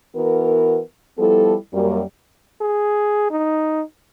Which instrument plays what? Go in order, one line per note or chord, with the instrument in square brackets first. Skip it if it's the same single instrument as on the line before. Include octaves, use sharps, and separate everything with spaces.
[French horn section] E3 B3 F#4 A#4
F3 G3 B3 E4 A4
F#2 G3 A#3
[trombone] G#4
D#4